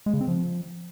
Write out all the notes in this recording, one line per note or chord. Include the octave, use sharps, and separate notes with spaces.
G#3
C#3
C4
F3